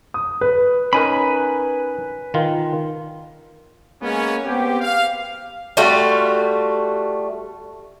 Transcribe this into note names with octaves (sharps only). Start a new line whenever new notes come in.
D#6
B4
C#4 D#4 A#4 B4 G#5 B5
D#3 F4
G#3 A#3 B3 C#4
B3 C4 G4
F5
G3 A3 F4 F#4